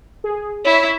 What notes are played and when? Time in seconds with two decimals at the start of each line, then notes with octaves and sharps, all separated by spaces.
0.24 G#4
0.65 E4 C#5 E5